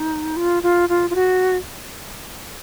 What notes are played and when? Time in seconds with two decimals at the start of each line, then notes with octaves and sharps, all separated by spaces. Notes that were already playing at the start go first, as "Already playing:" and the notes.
Already playing: D#4
0.36 F4
0.62 F4
0.89 F4
1.10 F4
1.15 F#4